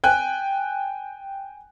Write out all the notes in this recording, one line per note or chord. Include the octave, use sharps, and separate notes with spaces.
G5 G#5 F#6